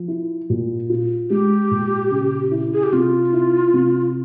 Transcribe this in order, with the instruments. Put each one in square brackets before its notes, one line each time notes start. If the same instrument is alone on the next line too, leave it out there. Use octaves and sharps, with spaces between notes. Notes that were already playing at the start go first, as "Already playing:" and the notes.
Already playing: [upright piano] F3
E4
A#2
F4
[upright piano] G#3 [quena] G4
[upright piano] A#2
C#3
E4
[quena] G#4
G4
[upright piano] C3 [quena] F4
[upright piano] E4
C3